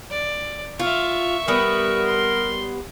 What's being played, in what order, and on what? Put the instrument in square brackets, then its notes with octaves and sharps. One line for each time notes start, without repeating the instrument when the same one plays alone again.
[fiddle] D5
[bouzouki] F4 [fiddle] E5 C#6
[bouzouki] G3 B3 [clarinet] A#4
[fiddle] C6